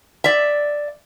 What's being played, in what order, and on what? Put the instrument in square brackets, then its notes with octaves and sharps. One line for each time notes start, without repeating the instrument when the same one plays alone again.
[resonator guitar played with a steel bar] D5 E5